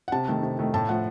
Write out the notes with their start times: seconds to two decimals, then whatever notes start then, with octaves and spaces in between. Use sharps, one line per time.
0.08 F#5
0.12 C3 A5
0.28 D#3 A3
0.43 C3
0.59 D#3 A3
0.74 A2 A5
0.89 F3 A3 F#5